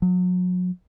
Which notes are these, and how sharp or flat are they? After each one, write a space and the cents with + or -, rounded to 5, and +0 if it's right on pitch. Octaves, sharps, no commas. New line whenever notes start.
F#3 -35